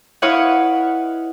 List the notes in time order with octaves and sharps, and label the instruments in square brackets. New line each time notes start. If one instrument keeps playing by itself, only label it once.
[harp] E4 B4 C#5 D#5 F5 F#5